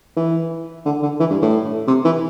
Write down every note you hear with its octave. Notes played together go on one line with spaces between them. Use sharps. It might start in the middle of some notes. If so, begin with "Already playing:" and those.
E3
D3
D3
E3
G2
A2
C3
E3